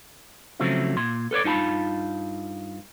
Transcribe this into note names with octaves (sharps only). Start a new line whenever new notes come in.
C#3 F3 F#3 A3 C4 E4
A#2 C6
A4 B4 C#5 D5
G2 D#4 F4 A5 B5